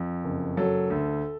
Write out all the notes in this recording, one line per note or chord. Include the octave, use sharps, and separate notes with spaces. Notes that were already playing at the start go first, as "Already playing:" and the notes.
Already playing: F2
F#1
F#3 A4
D2